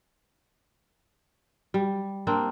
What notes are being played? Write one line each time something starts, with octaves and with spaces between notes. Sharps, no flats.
G3
A#3 C4 D4